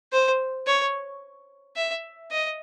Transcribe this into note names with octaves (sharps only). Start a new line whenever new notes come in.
C5
C#5
E5
D#5